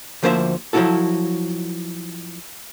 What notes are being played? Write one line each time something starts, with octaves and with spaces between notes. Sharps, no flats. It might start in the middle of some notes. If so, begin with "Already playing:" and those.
D2 F3 A#3 C5 D5 E5
F3 F#3 G#3 E4 F#4 A4